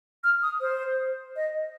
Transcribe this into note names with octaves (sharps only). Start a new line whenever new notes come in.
F6
D#6
C5
D#5